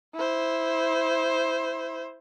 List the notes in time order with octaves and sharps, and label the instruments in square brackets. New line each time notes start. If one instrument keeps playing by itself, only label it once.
[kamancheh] E4 C5